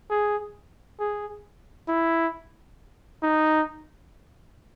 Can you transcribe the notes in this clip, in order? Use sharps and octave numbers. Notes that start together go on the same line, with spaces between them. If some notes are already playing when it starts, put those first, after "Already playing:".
G#4
G#4
E4
D#4